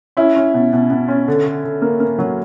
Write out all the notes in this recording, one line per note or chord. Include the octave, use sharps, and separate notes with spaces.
C#4 E4
C#4
B2
B2
B2
C#4
D3
D3
D3
A#3
A#3
F#3